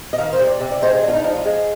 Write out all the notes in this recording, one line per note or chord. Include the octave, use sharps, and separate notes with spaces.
D#5
D#3 F5
C5
C3
D5
C3
D5
G#3 C5
G#4
D4
F4
D#4
F3 D#4
F4
G#3 G#4